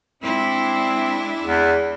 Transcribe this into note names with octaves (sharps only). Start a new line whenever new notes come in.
G#3 C4 D4 E4
E2